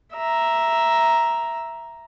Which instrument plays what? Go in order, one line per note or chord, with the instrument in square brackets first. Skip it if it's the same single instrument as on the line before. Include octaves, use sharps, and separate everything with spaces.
[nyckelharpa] E5 A#5